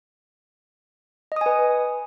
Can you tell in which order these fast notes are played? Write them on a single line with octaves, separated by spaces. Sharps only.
D#5 D#6 G#5 B4